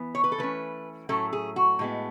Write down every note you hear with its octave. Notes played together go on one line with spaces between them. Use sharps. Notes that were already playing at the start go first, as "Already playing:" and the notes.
Already playing: E3 B3
C#5
B4
A4
E3 A3 C#4 B4
A2 F#3 A3 C#4 A4
G#4
F#4
A2 G#3 B3